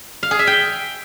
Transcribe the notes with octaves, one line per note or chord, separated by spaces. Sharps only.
F5
G#4
E5
G5